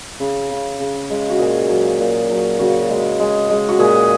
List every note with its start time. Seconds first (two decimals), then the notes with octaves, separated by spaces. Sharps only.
0.20 C#3
0.50 C#3
0.80 C#3
1.10 G#3
1.30 F#4
1.39 A#2 G#4
1.69 F#3
2.00 A#2
2.30 F#3
2.59 C#3 F#4
2.89 G#3
3.19 G#3
3.50 G#3
3.69 F#4
3.79 A#2 G#4